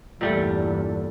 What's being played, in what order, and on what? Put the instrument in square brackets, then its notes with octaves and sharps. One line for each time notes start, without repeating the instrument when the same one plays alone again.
[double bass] E2 G2 [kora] A#2 G3 A3